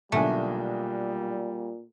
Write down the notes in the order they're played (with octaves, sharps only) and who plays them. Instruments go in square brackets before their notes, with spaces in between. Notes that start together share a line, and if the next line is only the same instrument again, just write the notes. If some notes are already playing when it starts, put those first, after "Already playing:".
[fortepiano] B1 D3 G#5 [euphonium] A#2 [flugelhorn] G3 [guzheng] A3